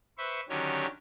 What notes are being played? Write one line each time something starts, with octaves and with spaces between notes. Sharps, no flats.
B4 C5 E5 C#6
D3 D#3 F#3 C#4 G4 C#5